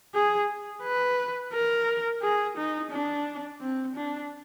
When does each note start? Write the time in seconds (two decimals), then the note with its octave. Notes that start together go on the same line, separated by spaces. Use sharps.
0.14 G#4
0.83 B4
1.53 A#4
2.22 G#4
2.57 D#4
2.91 D4
3.61 C4
3.96 D4